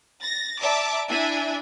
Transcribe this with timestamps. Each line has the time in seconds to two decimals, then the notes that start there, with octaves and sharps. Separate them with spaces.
0.22 A6 A#6
0.61 D5 E5 A5 A#5 D6
1.09 D4 E4 E5 G#5